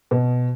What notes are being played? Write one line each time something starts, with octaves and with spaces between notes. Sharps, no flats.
B2